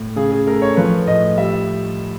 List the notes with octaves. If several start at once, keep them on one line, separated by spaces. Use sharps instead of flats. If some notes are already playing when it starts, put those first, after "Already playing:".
Already playing: A2
C#3 G#4
G#4
A3 A#4
C#5
F3 B4
A2 D#5
G3 E5